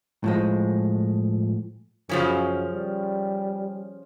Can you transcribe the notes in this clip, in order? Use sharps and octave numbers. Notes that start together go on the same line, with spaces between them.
A2 F3 G#3
F#2 C#3 F3 C#4
G3